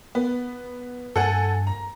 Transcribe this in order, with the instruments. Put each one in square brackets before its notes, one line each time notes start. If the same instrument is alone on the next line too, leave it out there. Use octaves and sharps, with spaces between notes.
[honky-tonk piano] B3
[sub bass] G2 [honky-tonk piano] A4 F#5 G#5
[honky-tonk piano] A#5